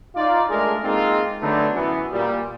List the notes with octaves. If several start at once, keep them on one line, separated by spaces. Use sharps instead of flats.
D#4 F4 D5
G#3 A3 D4 G#4 A#4
G#3 A#3 C4 D#4 F4
D3 F#3 A3 B3 D4 D#4
F#2 E3 B3
A#2 G3